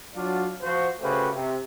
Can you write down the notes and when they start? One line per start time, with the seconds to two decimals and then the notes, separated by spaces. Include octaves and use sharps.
0.16 F#3 D4 F4
0.62 F3 F#4 C5
1.01 C#3 A3 F#4 G4 B4 C5
1.33 C3